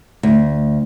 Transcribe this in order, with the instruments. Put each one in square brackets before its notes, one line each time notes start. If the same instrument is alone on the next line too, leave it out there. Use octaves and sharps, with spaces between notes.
[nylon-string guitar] D2